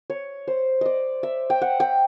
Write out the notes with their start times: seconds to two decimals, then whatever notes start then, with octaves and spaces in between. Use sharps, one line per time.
0.10 C#5
0.48 C5
0.81 D5 D#5
1.23 E5
1.50 G5
1.62 F#5
1.80 G5